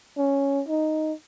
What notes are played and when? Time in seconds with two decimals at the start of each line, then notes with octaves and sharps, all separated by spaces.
0.17 C#4
0.68 D#4